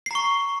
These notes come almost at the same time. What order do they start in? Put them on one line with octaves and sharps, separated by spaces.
C7 A#5 C#6